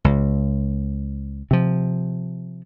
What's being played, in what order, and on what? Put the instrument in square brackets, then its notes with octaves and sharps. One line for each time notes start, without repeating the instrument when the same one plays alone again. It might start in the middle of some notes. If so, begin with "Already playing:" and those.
[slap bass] C#2
C3 F3